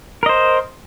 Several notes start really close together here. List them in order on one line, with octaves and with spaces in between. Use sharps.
A#4 D#5 C5